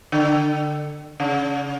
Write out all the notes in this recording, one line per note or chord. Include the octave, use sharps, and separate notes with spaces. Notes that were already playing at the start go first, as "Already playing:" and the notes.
D3
C#3